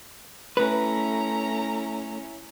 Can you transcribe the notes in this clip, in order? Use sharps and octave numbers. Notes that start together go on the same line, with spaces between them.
A3 C#4 E4 B4 A#5